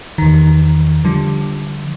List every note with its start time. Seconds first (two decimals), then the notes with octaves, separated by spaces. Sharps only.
0.18 E2 D#3
1.04 D3 F3 G3